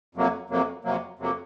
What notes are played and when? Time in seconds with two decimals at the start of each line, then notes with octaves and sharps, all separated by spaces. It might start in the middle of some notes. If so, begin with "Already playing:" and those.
0.15 F2 C3 F#3 A#3
0.49 F2 C3 F#3 A#3
0.84 F2 C3 F#3 A#3
1.19 F2 C3 F#3 A#3